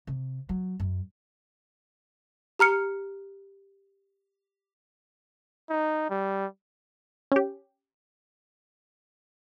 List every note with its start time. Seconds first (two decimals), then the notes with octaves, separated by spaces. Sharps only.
0.07 C3
0.49 F#3
0.80 F#2
2.59 G4 A#5 F6 C#7
5.70 D#4
6.10 G3
7.32 C#4 G4